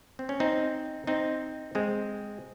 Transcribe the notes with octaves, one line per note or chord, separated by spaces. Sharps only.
C4
C#4
C4 D#4
C4 D#4
G#3 C4